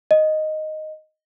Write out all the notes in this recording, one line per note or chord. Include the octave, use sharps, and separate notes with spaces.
D#5